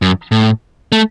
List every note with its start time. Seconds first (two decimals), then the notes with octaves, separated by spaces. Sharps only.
0.02 F#2
0.32 A2
0.92 A3